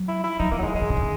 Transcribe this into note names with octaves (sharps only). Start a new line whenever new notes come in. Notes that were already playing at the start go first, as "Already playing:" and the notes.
Already playing: F#3
E4
E4
F#3 D#4
E3 A#3
F#3
D#3 G#3
E3 G#3
D#3
C#3
D#3